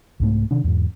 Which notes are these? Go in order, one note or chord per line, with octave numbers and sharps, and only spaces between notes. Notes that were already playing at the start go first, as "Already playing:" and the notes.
C2 G#2 A3
C3 D#3 D4
E2 G#2